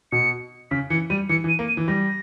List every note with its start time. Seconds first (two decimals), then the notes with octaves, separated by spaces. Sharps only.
0.12 B2 C#7
0.71 C#3 B6
0.90 E3 C#7
1.10 G3 D#7
1.29 E3 C#7
1.44 E3
1.49 D#7
1.59 A#3
1.68 D#7
1.77 E3
1.88 G3 A#6